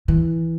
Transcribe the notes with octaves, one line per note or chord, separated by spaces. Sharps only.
E3